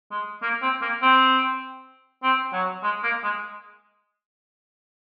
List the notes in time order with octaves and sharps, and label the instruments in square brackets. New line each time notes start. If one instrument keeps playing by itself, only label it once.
[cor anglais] G#3
A#3
C4
A#3
C4
C4
F#3
G#3
A#3
G#3